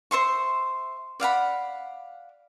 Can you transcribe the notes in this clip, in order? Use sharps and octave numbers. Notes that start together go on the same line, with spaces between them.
C5 E5 C6 C#6
D5 F5 F#5 B5